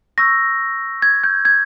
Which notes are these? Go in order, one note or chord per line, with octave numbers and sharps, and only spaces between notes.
C#6 E6 G6 A#6
G#6
G6
G#6